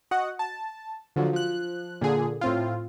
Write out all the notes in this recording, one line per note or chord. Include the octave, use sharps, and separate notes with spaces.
F#4 D#5 F#5
A5
D3 F3 F#3
F3 F#6
A#2 D3 G#4
A2 C4 F4